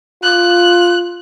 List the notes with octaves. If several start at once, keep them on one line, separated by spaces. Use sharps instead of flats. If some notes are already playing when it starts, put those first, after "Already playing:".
F4 F#6